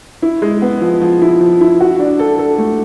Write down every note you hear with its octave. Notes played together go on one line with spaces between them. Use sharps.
E4
G#3
B3
F3
F3
E4
F3
E4
F#4
D4
A4
A4
A3